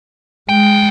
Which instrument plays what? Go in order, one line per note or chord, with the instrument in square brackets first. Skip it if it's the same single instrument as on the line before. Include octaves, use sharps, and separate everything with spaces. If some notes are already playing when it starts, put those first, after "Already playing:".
[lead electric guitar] B1 G5 [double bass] G#3